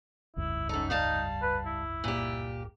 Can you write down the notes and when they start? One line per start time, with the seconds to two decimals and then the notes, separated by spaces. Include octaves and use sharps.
0.36 F1 C#2 G2 E4
0.69 F#2 D#4 A4
0.90 G3 D#4 F5 A5
1.42 B4
1.66 E4
2.04 A#2 G4